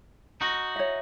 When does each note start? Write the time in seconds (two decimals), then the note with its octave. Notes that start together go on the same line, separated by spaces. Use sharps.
0.41 D#4 F#4
0.76 C#5 E5